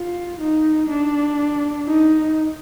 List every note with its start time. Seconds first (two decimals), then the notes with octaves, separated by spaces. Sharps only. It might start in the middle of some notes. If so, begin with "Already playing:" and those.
Already playing: F4
0.40 D#4
0.89 D4
1.86 D#4